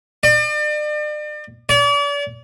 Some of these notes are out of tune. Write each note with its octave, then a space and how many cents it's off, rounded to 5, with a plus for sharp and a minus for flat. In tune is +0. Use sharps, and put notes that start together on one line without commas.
D5 +40
D5 -40